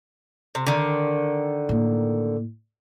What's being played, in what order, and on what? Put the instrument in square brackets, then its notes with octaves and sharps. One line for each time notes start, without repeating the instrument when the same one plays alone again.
[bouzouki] C3
D3 D#3
[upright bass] A2 A#3